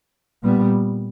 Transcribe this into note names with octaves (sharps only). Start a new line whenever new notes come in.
A#2 G3 B3